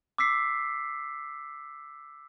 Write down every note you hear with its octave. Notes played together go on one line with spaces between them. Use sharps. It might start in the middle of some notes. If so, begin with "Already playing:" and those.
D6 E6 B6 C7